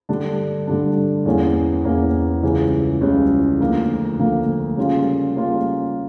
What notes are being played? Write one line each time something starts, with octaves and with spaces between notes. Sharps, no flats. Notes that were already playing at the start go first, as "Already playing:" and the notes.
G2 D3 G3 D4
G2 D3 G3 D4
E2 E3 A#3 C#4
E2 E3 A#3 C#4
C#2 C#3 E3 G3 C#4
C#2 C#3 E3 G3 C#4
D2 D3 F3 A#3
D2 D3 F3 A#3
C#3 G3 A#3 C#4 F4
C#3 G3 A#3 C#4 F4